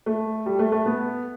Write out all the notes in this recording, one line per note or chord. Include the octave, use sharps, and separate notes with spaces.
A3
G3
A3
A3
B3